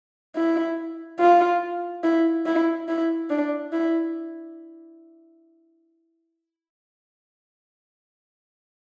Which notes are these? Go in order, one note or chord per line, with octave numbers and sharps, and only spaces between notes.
E4
F4
E4
E4
E4
D4
E4